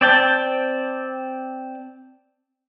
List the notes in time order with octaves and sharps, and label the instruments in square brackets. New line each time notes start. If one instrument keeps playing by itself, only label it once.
[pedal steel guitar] C4 D5 G5 A5